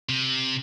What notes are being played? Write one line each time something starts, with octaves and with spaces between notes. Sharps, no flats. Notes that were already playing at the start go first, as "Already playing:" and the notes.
C3